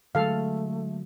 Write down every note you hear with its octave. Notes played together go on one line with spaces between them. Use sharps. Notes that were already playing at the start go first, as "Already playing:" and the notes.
D3 F#3 G#3 A3 A4 F5